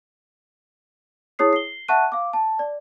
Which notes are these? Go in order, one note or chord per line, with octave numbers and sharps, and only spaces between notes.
E4 G#4 C#5 D#6 C7
C7 G7
E5 F#5 A5 C#6 F#6 D#7
F5 D6
A5
D5